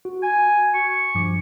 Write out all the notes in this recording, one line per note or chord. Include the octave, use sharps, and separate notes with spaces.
F#4
G#5
C#6
G2 F3 D6